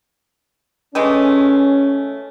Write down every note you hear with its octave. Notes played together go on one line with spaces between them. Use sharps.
E3 G#3 A3 C#4